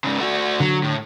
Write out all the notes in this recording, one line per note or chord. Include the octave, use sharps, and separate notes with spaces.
G#2 C#3
A3 F#4
D3 F#3
A2